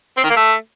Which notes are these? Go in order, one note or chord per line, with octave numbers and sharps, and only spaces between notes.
C4
D#3
A#3
A3